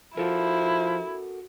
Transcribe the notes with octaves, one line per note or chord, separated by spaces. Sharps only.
F3 E4 F#4 A4 A#4